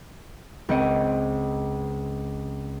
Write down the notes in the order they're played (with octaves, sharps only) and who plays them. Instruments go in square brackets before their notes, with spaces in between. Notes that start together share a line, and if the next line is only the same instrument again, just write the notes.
[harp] C#2 C4 D#5 C#7